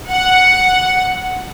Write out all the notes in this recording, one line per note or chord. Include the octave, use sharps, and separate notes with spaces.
F#5